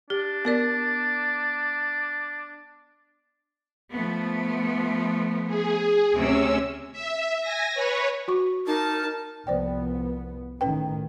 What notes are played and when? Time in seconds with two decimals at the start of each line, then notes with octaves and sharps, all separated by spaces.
0.10 D4 G4
0.45 B3 A#4 D5
3.93 F3 A3 B3
5.47 G#4
6.13 D2 C3 C#4 E6
6.92 E5
7.41 G#5 A#6
7.75 B4 C#5
8.28 F#4 C#6
8.67 D#4 A#4 A5
9.47 C2 F3 B3 C5 D5 G5
10.61 A2 D#3 C#4 B4 G5